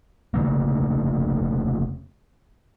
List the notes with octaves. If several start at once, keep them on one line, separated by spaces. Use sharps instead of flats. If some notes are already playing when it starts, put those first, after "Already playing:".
F1 C#3 A3 A#3